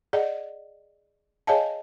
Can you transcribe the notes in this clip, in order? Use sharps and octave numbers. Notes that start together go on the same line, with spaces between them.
G#4 D5 D#5 F#5
G#4 C#5 D#5 F5 G#5 A5